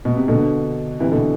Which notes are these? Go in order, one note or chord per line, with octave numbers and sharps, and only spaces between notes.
B2
C3
B2 D3
C3 E3
B2 D3